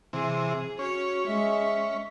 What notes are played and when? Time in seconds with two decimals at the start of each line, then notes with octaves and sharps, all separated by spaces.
0.13 C3 E3 G#4
0.79 C#4 F#4 C#5
1.27 G#3 E5